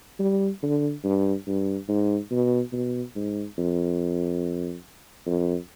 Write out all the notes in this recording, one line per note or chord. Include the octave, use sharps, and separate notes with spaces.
G3
D3
G2
G2
G#2
B2
B2
G#2
F2
F2